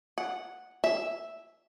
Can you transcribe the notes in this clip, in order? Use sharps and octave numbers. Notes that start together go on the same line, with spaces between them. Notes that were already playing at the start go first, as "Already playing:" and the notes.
F#5
E5